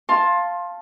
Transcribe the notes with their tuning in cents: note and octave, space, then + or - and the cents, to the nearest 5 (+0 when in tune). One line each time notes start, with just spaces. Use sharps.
F5 +0 A5 +0 C6 +20